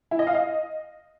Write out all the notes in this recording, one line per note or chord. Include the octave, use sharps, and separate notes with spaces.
E4
D#5
F5
D#5